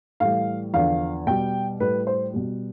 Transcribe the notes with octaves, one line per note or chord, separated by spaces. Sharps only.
A2 E3 G3 F5
E2 D3 F3 F5
B2 G3 G5
A2 G3 B4
C5
B2 G3